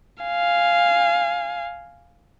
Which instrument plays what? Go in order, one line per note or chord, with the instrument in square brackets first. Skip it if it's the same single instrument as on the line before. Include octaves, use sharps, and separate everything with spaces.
[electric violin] F5 G#5